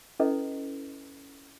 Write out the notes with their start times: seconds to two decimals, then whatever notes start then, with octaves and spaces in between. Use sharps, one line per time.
0.20 C#4 E4 A4 B4 D#5